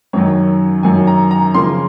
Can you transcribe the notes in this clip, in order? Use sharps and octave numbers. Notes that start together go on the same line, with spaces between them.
F#2 D#3 F#3 C#5
F#2 D#3 F#3 G#5
A#5
A#5
C#3 F3 A#3 C6